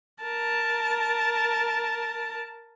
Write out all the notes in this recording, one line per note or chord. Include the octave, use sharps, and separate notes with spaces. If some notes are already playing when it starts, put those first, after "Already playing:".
A#4 A5